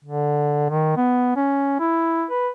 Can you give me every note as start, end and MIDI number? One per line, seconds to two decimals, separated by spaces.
0.05 0.66 50
0.70 0.92 51
0.97 1.33 59
1.36 1.76 61
1.80 2.25 64
2.31 2.49 71